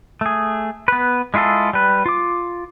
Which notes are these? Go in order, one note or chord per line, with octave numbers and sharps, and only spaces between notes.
A3 G#4
B3 B4
G#3 E4 F4 G#4 A4
G3 B4
F4 D6